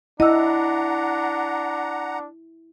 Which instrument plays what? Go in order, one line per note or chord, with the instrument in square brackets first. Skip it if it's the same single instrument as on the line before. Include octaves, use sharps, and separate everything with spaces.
[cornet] D4 [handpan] E4 [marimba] D#5 E6 [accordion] F#5 A#5